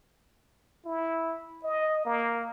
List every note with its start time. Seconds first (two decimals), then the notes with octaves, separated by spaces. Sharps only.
0.85 E4
1.63 D#5
2.05 A#3